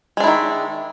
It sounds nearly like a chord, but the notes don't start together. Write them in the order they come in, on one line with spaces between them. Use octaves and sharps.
G#3 D4 E4 D#3